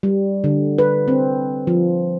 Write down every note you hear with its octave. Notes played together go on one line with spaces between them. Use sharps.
G3
D3
B4
C4
F3